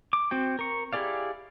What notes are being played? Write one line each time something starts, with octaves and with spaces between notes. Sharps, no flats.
D6
C4 F#4 G5
A#4 C#6
E4 G4 G#4 D5 F5